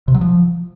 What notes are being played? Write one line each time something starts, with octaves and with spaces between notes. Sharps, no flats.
C3
F#3
F3